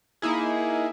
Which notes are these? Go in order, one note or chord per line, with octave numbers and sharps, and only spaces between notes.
A#3 D#4 E4 G#4